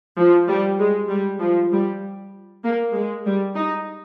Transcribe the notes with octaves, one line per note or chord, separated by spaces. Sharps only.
F3
G3
G#3
G3
F3
G3
A#3
G#3
G3
D#4